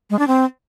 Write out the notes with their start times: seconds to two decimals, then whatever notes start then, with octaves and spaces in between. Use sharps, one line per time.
0.10 G#3
0.19 D4
0.27 C4